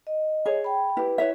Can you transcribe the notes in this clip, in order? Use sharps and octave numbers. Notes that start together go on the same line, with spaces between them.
D#5
G#4 C#5
G5 B5
E4 G4 B4
E4 B4 C#5 E5